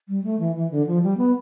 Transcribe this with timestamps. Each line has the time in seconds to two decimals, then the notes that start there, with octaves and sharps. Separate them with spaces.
0.08 G3
0.24 A3
0.39 E3
0.56 E3
0.71 D3
0.87 F3
1.03 G3
1.17 B3